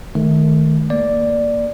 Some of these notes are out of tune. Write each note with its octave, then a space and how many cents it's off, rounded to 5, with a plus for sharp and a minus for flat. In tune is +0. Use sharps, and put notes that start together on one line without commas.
D#3 +0 A3 -30
A#3 +0 D5 +0